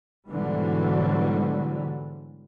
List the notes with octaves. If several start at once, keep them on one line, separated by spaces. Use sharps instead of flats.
G#2 B2 D3 E3 F#3 G3